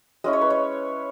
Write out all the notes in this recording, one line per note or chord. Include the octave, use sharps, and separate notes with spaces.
G#3 C#4 E4 D#5
C#5
B4
C#5